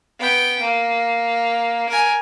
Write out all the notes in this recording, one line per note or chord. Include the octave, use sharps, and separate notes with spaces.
B3 G5
A#3
A#4 G#5